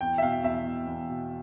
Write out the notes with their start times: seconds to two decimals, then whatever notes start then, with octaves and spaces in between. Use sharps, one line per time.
0.01 E2 G5
0.18 E5
0.22 B2 F5
0.44 E2 E5
0.66 B2
0.87 E2
1.09 B2